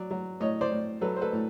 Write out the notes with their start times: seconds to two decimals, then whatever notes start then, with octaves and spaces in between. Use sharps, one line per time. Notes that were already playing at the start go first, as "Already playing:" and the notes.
Already playing: F#3 D5
0.11 F#3
0.40 A2 C#5 D#5
0.61 C5 D5
0.72 A2
1.01 F#3 A4 B4
1.17 C5
1.22 A4 B4
1.33 A2